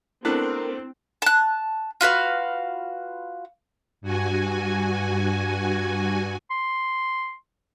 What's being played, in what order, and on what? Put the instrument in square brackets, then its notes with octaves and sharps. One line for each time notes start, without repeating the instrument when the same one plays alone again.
[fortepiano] A3 B3 D4 [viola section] C4 [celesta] E4 [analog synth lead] A#4
[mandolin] A5 F#6
F4 F#4 B4 F5
[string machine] G2 F#4 G#5
[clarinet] C6